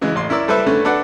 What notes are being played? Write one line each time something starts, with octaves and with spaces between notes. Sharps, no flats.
C#3 E3 G#3
A1 C6
C#4 E4 A#4 D5 E6
G3 A4 B4 C5 D5 E5
D3 A3 C#4 B4
D4 A4 B4 D5 F#5